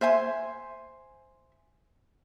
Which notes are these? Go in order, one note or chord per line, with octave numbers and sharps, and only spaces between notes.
C5 E5 G#5 C6